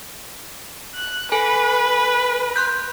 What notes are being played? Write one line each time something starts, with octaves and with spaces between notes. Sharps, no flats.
F#6
A4 B4 G#5
C6 F#6 G6